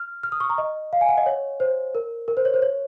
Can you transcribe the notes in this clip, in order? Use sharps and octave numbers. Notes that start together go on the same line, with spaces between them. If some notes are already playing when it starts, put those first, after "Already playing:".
Already playing: F6
F6
D#6
C#6
A#5
D#5
F5
G#5
F#5
D#5
C#5
C5
A#4
A#4
C5
C#5
C5
C#5